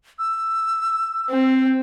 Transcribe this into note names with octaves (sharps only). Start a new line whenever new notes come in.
E6
C4